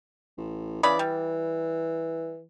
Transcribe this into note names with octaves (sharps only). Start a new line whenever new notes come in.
A1
C#3 E3 D5 B5
G3